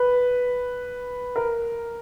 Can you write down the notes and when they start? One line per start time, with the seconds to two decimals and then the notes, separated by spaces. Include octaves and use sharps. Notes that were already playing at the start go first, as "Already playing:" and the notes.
Already playing: B4
1.36 A#4